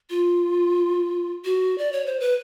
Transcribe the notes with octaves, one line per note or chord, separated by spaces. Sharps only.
F4
F#4
D5
C#5
C5
B4